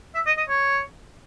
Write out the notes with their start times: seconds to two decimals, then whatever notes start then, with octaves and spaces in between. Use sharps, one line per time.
0.15 E5
0.26 D#5
0.38 D#5
0.49 C#5